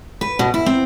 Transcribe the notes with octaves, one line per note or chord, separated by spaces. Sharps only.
B4
B2
E4
C4